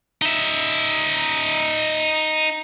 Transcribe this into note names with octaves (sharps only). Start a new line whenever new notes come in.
D#4 E5